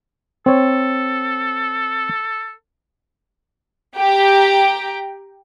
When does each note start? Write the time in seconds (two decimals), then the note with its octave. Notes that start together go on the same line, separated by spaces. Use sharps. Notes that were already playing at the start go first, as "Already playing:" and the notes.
0.46 C4 A4 C#5
3.96 G4 G5 A#5